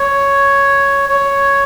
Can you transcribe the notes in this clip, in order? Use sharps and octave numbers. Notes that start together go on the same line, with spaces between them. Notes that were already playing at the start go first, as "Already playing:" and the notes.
Already playing: C#5
C#5